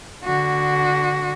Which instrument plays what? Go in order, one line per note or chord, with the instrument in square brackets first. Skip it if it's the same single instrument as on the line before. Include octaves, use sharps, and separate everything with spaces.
[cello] D3 F#4